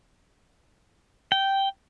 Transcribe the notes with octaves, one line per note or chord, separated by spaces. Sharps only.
G5